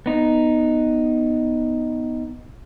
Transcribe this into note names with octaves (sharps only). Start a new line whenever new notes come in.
B3 D#4